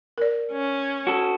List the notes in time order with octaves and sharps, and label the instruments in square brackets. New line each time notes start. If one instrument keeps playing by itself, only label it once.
[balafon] A#4 D5
[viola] C#4
[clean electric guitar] F#4 A4